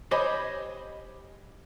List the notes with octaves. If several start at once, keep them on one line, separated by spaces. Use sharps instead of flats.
G4 C5 C#5 D#5 G#5 B5